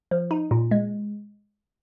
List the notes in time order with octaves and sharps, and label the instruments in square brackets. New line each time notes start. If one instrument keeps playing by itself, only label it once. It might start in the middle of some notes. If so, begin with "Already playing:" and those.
[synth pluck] F3
D#4
A#2
G#3